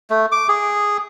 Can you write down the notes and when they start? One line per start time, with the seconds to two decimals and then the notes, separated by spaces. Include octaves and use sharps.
0.10 A3
0.32 D6
0.49 G#4